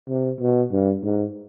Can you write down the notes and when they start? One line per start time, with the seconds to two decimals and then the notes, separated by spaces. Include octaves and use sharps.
0.09 C3
0.41 B2
0.72 G2
1.03 G#2